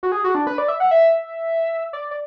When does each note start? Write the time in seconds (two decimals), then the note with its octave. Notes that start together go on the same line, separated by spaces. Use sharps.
0.03 F#4
0.12 G#4
0.24 F#4
0.35 D4
0.47 B4
0.58 D5
0.68 E5
0.80 F#5
0.91 E5
1.93 D5
2.11 D5